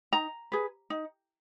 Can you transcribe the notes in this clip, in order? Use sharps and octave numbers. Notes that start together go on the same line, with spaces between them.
D#4 A#5
G#4 B4
D#4